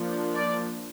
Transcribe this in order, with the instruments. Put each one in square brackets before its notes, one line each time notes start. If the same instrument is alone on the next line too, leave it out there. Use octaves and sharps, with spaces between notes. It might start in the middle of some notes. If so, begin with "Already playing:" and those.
Already playing: [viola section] F3 A#3 D4
D5